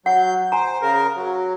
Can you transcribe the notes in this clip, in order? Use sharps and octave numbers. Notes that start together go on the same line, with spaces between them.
F#3 F#5 G6
C5 G#5 A#5
C#3 A#4
F#3